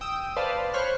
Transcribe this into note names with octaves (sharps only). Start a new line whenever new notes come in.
G5 D#6 E6
B4 C5 D5 F5 A5
C5 C#5 B5 C#6 F6 F#6